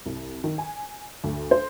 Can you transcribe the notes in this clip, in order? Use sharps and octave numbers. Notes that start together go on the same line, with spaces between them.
C2
D#3
G#5
D2
C5